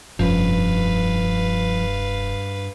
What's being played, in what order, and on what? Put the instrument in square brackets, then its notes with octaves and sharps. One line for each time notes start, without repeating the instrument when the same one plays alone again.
[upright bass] F1 C#4 [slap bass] G2 [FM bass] F3 [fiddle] B4 F5